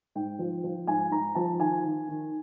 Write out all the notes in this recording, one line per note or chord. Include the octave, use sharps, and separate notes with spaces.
G#2 G5
F3
F3
G#2 G#5
G#2 A#5
F3 A5
D#3 G#5
D#3
D#3